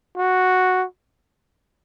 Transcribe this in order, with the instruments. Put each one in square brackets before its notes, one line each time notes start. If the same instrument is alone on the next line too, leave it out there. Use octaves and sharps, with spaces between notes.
[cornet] F#4